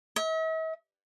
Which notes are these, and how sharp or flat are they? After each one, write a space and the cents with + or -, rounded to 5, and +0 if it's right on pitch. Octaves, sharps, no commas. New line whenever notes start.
E5 -45